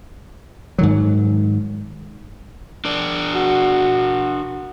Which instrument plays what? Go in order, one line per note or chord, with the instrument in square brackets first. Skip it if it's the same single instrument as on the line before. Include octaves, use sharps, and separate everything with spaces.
[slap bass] G#2 D#3 F#3
[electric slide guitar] D4 A#4 D5
[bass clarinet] F#4